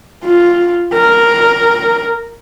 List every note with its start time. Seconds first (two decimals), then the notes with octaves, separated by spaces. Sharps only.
0.24 F4
0.94 A#4